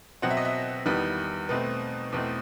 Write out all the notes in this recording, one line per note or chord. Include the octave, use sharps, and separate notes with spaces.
B2 F#3 C4 F#5
E5
D#5
E5
E2 D#3 G3 B3
B2 A3 C4 B4
E2 B2 A3 C4